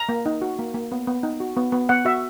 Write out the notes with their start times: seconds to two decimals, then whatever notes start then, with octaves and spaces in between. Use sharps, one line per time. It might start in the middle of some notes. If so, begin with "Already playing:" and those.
Already playing: A#5
0.09 A#3
0.26 D#4
0.41 F#4
0.59 A#3
0.74 A#3
0.92 B3
1.07 B3
1.23 D#4
1.40 F#4
1.57 B3
1.72 B3
1.89 B3 F#5
2.05 F#4 E5